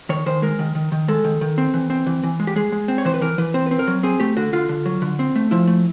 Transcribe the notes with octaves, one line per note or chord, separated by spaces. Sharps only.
D#3 C#5
D#3 C5
G#3 A#4
D#3
D#3
D#3
G#3 A4
D#3
D#3
C4
E3
C4
E3
E3
G#3
G4
G#3 G#4
G#3
C4
C#5
E3 C5
B4
E3 A#4
E3 B4
C4 C5
C4 B4
A#4
F#3
C4 G#4
A3 G4
D3 F#4
D3 F4
D3
F#3
D3
C4
A3
F3 E4
A3